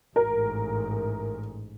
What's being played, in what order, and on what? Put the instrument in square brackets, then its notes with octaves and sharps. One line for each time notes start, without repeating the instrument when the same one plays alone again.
[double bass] A1 G#2 [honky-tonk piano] A#4